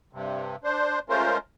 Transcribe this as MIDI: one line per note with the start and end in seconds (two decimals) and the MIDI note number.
0.13 0.56 43
0.13 0.56 48
0.64 0.99 62
0.64 0.99 72
1.09 1.38 56
1.09 1.38 57
1.09 1.38 61
1.09 1.38 65
1.09 1.38 70
1.09 1.38 72